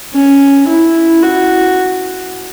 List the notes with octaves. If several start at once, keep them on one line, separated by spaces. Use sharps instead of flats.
C#4
E4
F#4